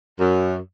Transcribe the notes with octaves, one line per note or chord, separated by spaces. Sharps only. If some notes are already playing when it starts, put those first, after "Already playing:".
F#2